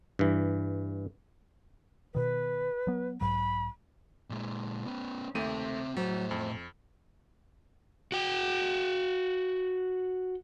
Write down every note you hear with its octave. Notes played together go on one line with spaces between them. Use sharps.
G2 E3
B2 D#3 B4
F#3 B3
B1 G#2 F#3 B5
A#2 G#3
B3 C#4
D#2 A3 C4 E5 D#7
A2 F#3 C5
F2
F#4 G5